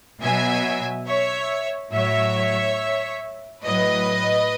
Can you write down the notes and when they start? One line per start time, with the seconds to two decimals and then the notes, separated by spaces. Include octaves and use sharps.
0.21 B2 F#3 E5 G#5
1.07 C#5 E5
1.93 A2 F#3 C#5 E5
3.64 A2 F#3 B4 D#5